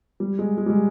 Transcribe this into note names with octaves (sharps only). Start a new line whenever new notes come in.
G3
G#3
G#3
G3
G#3